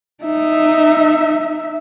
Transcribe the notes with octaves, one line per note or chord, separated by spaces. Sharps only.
D#4 E5